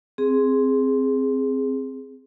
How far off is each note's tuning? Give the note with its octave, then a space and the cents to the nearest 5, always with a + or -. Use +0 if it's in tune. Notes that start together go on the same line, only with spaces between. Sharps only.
C4 +0 G#4 +0